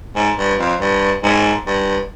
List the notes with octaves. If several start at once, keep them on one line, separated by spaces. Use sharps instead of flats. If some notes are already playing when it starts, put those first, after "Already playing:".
G#2
G2
F2
G2
G#2
G2